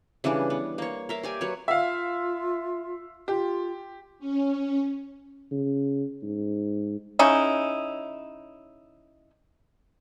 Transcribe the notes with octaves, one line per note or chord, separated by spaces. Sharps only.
C#3 E3 G3 D4
B3
A#3 C#5
A#4 E5 F5
G4 D5 G#5
F#3 B4 C#5
F4 E5 F5
F4 G4
C#4
C#3
G#2
C#3 C#4 D#4 E4